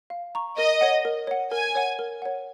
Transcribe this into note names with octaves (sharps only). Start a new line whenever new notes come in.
F5
A#5 C#6
A#4 D#5
C#5 F#5
A#4
C#5 F#5
A#4 G#5
C#5 F#5
A#4
C#5 F#5